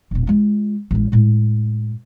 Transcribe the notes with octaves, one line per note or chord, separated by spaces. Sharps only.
E1 A#2
G#3 F4
A1 G#3
A2 G#3